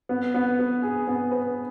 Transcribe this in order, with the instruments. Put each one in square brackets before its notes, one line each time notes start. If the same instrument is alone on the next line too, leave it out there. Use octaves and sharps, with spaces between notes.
[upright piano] B3
B3
B3
G#4
B3
B4